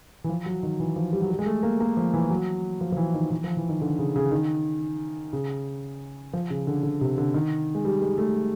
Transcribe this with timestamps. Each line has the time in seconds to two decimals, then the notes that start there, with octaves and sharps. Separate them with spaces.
0.24 E3
0.29 F3
0.46 F#3
0.63 D#3
0.80 E3
0.96 F3
1.12 G3
1.22 F#3
1.30 G3
1.39 G#3
1.46 A3
1.63 A#3
1.80 A#3
1.97 F3
2.14 E3
2.30 F#3
2.81 F3
2.92 F3
2.97 E3
3.14 D#3
3.31 E3
3.44 F3
3.57 E3
3.69 D#3
3.81 D3
3.99 C#3
4.16 C#3
4.31 D#3
5.33 C#3
6.33 F3
6.50 C#3
6.67 D3
6.83 D3
7.01 C3
7.18 D3
7.34 D#3
7.75 G#3
7.85 G3
8.02 G#3
8.18 A3